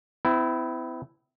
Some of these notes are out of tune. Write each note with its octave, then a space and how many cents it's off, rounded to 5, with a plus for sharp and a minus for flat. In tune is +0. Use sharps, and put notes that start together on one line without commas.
C4 -45 E4 +0